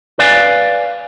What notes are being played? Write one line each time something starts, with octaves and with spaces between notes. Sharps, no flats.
B4 D5 F5 G#5